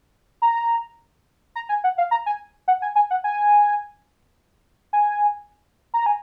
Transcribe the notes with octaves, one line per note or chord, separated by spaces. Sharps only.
A#5
A#5
G#5
F#5
F5
A#5
G#5
F#5
G#5
G#5
F#5
G#5
G#5
A#5
G#5